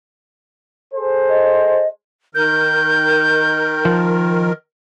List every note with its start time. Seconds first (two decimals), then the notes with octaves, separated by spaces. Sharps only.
0.94 G#4 A4 C5
1.29 D#5
2.35 D#3 A#4 G6
3.85 F3